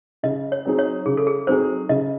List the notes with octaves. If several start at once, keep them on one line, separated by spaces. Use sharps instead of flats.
C#3 D#5
C#5
F#3 C4 D#4 G#4
C#5
C#3 G#4
A4
G#4
F#3 C4 D#4 G#4 C5
C#3 D#5